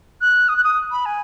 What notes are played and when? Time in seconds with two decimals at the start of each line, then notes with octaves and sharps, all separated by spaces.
0.21 F#6
0.49 D#6
0.57 F#6
0.64 D#6
0.91 B5
1.06 G#5